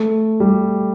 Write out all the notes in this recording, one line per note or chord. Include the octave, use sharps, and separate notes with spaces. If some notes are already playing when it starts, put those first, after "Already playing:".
Already playing: A3
G3